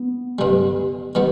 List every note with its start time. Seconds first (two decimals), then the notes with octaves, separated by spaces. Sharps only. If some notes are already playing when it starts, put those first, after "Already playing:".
Already playing: B3
0.39 G2 D3 G3
1.15 D#3 G3 B3